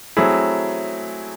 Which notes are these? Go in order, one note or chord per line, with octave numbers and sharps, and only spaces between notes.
F#3 A3 C4 E4 G#4